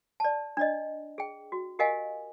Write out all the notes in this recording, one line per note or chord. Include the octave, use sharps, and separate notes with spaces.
D5 A5
D4 D5 D#5
G#4 G5
F#4
G4 A#4 D#5 F5 G#5